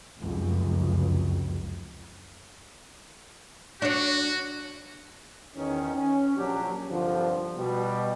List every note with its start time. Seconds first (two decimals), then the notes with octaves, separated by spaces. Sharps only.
0.20 F1 C#2 F#2
3.82 D4 F#4 C#5
5.56 E2 D#3 C#4
5.94 C#4
6.37 A#1 F#3 D4 G4
6.90 G1 C2 G2 D3 F3
7.57 B2 G3